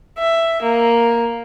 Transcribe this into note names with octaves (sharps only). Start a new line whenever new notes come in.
E5
A#3